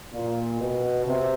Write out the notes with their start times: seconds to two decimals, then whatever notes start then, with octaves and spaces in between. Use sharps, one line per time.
0.13 A#2
0.60 B2
1.06 C3